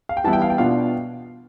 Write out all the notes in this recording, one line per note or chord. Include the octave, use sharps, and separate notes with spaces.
F5
G5
E3 G3 B3 E4 A5
G5
F5
G5
B2 B3 D4 F4 F5